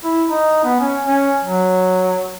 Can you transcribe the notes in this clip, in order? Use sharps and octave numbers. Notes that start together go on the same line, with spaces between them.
E4
D#4
B3
C#4
C#4
F#3